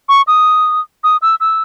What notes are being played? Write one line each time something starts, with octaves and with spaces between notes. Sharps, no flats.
C#6
D#6
D#6
E6
E6